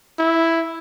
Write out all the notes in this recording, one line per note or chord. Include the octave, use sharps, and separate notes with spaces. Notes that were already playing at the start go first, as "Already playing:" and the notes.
E4